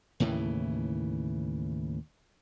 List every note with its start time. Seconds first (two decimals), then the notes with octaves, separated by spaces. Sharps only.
0.20 D#2 A2 C#3 E3